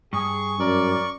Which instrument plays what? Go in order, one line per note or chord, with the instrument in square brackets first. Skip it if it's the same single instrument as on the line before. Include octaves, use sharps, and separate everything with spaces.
[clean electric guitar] G2 [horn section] G#4 [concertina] C#6
[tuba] F#2 [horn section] A#4 D5